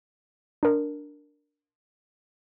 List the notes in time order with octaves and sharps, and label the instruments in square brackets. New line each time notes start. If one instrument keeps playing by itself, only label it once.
[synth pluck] D4 A#4